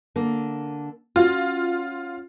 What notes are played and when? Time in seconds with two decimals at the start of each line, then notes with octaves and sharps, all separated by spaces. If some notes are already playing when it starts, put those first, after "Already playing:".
0.16 D3 A#3
1.16 C#4 F4 F#4